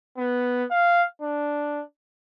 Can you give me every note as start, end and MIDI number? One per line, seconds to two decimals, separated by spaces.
0.18 0.64 59
0.71 1.04 77
1.21 1.83 62